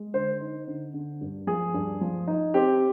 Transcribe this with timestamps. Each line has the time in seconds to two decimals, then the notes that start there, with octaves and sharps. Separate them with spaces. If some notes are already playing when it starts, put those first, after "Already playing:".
Already playing: G#3
0.14 D3 C5
0.41 D#4
0.67 D3
0.94 D3
1.21 G2
1.47 F3 G#4
1.74 G2
2.01 F3
2.27 D#4
2.54 C4 G4